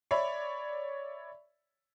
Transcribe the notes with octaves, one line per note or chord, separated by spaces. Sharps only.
C#5 D5 E5 B5